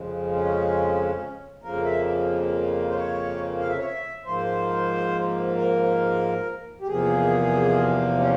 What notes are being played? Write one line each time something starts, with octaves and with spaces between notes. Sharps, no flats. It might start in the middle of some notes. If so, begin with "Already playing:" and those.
Already playing: F2 C#3 F3 G#3
C#4
F2 C#3 F3 A#3 A#4
E5
C5
C#5
F5
E5
C#5
E5
G#2 F3 A#3 C5
A#4
G4
E2 C3 F3 A#3 G#4
C#4